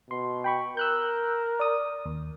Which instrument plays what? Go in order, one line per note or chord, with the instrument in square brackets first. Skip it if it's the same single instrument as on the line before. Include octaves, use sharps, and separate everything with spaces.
[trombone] B2 [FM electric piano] C6
[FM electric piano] G5 B5 C#6
[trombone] A#4 [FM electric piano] E6 F#6 G6
[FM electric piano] D5 D#6
D#2